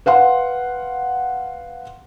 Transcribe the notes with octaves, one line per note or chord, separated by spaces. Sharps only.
B4 F5 F#5 C6